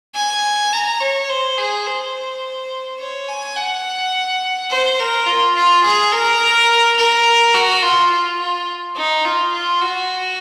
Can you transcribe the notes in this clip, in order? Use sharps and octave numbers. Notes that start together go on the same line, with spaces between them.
G#5
A#5
C#5
C5
G#4
C5
C#5
G#5
F#5
C5
A#4
F4
F4
G#4
A#4
A#4
F#4
F4
F4
F4
D#4
F4
F4
F#4